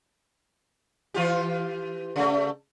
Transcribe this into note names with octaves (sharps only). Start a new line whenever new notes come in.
E3 F4 G4
C#3 A3